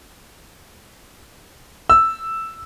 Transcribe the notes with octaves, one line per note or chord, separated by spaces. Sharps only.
E6